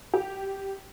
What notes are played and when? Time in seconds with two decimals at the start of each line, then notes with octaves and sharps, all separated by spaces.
0.14 G4